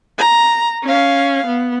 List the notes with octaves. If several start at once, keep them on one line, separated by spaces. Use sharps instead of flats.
A#5
C#4 F5
B3